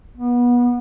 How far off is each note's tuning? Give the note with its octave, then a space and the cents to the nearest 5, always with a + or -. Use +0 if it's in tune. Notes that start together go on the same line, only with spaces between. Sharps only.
B3 -25